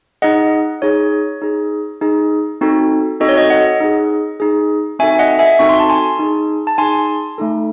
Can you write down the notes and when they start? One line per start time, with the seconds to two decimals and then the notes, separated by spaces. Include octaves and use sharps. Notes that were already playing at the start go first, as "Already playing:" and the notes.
0.22 D#4 G#4 D#5 F#5
0.82 D#4 G#4 C#5
1.42 D#4 G#4
2.01 D#4 G#4
2.61 C4 D#4 F#4 A4
3.20 C4 D#4 F#4 A4 D#5
3.29 C#5
3.37 D#5
3.50 D#5 F#5
3.80 D#4 G#4
4.40 D#4 G#4
4.99 C4 D#4 F#4 A4 E5 G#5
5.19 D#5 F#5
5.39 E5 G#5
5.59 C4 D#4 F#4 A4 C#6
5.69 C6
5.80 A5
5.89 G#5 C6
6.19 D#4 G#4
6.67 A5
6.78 D#4 G#4 G#5 C6
7.38 A3 D#4 A4